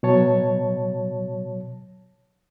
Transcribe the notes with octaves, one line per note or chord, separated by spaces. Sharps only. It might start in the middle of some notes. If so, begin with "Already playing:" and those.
B2 F#3 C#5 A5